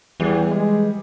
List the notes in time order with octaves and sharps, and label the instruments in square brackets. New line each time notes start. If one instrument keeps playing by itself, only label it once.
[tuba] E2 [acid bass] E3 [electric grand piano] G3 G4 G#4
[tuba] G#3